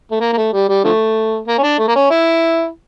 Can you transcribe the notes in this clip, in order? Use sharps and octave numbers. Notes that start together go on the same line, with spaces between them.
A3
A#3
A#3
A3
G3
G3
D3 F3 A3
A#3
C#4
D4
A3
A#3
C#4
E4